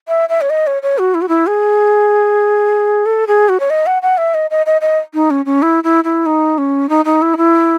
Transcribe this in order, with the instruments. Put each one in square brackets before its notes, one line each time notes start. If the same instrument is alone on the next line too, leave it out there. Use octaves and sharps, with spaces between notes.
[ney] E5
E5
C#5
D#5
C#5
C#5
F#4
E4
F#4
E4
G#4
A4
G#4
F#4
C#5
D#5
F#5
F#5
E5
D#5
D#5
D#5
D#5
D#4
C#4
C#4
E4
E4
E4
D#4
C#4
D#4
D#4
E4
D#4
E4